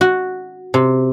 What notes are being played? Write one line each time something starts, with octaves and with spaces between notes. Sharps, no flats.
F#4
C3